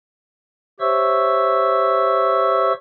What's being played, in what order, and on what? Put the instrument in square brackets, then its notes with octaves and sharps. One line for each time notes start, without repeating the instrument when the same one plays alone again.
[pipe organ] G4 C5 C#5 E5 C#6 E6